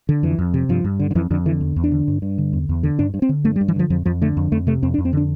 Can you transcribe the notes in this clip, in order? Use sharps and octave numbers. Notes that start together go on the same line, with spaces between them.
D3
F2 E3
F2
C3
G2 F3
G2
D3
D3
F2 E3
F2 D3
D3 E3
E2
E2
D4
D3
G2
G2
D3
E2
E2
D3
G2 D4
G2
C4
D3
G2 A3
G3
G2
E3
D3 F3
F2 F3
F2 F3
D3 A3
F2
F2 A3
C3 A3
F2 C4
D4
F2
C4
D3 D4